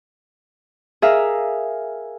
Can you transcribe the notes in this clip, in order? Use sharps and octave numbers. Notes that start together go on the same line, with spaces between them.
G#4 A#4 E5 F5